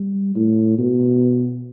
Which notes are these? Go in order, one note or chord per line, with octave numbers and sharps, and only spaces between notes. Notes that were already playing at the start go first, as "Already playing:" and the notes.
Already playing: G3
A2
B2